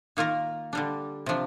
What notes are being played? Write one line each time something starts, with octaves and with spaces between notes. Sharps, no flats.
D#3 A#3 F4 A#4
D3 G3 D4
C3 F3 D4